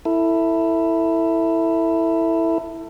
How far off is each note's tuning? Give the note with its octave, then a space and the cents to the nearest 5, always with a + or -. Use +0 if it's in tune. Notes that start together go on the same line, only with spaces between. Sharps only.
E4 +0 A4 +25